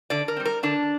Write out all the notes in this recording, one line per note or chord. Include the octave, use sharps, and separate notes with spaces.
D3 D5
A#4
G3 C4
A#4
D3 D4